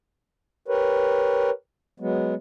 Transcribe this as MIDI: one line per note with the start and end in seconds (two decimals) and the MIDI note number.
0.68 1.50 67
0.68 1.50 70
0.68 1.50 71
0.68 1.50 73
2.00 2.34 54
2.00 2.34 56
2.00 2.34 59